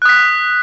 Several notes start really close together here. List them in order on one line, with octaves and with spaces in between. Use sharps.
F#6 D#6 B6